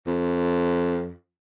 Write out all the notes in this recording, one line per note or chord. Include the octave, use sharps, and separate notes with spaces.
F2